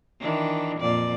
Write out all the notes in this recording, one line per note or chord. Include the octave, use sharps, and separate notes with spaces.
D#3 E3 D4
F2 A#2 D5